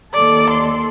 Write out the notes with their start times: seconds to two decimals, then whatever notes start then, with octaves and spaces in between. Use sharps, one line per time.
0.14 D#2 A4 D5
0.50 C6